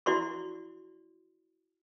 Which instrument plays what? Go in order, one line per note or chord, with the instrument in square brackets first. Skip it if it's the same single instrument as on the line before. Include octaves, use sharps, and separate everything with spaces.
[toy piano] E4 F#4 D5 C6 C#6